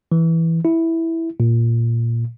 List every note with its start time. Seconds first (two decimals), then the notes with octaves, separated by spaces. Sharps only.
0.12 E3
0.65 E4
1.40 A#2